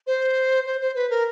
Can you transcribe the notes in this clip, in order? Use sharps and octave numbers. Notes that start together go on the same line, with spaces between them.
C5
C5
C5
B4
A#4